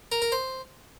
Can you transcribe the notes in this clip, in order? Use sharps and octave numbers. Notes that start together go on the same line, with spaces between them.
A#4
A#4
C5